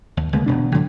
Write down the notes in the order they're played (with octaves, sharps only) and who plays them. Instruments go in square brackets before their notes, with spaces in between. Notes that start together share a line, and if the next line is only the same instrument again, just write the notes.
[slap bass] D#2
C#2 D3 G#3 A#3
E1 B2 D4
A2 D3 F#3